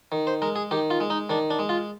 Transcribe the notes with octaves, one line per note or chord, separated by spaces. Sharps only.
D#3
C5
G#3 A#4
G#4
D#3 G4
F4
G#3
D#4
D#3 D4
D4
G#3
F4